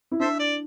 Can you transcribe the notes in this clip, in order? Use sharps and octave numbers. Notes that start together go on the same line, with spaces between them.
E4
D4 A4 C5 E5
D5